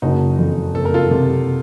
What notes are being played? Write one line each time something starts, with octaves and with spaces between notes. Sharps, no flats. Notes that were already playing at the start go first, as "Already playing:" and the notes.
F#1 D#4 F#4
F2
F#1 A4
A#4
F4 A4
C3